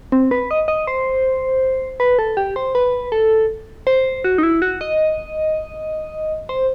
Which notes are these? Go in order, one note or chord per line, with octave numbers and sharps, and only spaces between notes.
C4
B4
D#5
D#5
C5
B4
A4
G4
C5
B4
A4
C5
F#4
D#4
E4
F#4
D#5
C5